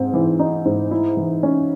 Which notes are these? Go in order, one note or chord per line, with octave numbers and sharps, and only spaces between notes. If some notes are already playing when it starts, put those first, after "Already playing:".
Already playing: G#2 C4
E3
D#4
G#2
E4
E3
C#4